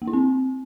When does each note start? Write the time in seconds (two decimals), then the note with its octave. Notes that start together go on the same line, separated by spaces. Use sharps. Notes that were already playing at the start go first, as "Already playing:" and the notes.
0.02 A#3
0.08 E4
0.13 C4